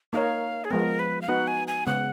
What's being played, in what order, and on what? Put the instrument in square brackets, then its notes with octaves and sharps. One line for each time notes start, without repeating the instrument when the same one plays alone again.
[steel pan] A#3 D#4 A#4 C#5 [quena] F5
[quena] G#4
[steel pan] F3 G#3 B3 [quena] A#4
[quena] B4
F5
[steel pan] B3 D#4 F#4 B4 [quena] F#5
[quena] G#5
G#5
[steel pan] C#3 G#3 B3 [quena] F#5